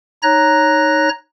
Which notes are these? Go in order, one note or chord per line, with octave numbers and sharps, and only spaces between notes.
D#4 C#5 A#5 F#6 A#6